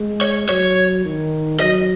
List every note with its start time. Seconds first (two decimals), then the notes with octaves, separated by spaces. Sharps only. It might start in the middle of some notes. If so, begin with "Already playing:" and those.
Already playing: G#3
0.21 C#5
0.49 F#3 C#5
1.05 D#3
1.60 F#3 D#5